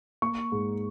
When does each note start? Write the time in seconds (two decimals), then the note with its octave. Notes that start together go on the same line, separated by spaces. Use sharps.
0.22 A#3 C#6
0.52 G#2